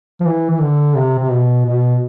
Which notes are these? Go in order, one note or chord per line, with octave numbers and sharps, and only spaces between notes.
F3
E3
E3
D3
C3
C3
B2
B2